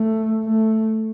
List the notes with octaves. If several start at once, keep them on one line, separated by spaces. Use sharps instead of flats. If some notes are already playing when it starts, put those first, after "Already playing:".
Already playing: A3
A3